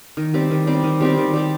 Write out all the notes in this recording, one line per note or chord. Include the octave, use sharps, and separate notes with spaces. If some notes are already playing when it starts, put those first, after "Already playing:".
D#3
G3 C4 G4
D#3
G3 C4 G4
D#3
G3 C4 G4
D#3
G3 C4 G4